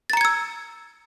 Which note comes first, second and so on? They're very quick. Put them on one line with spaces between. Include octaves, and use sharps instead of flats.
A6 A#5 C#7 G#6 E6